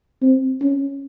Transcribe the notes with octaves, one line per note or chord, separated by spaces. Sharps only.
C4
C#4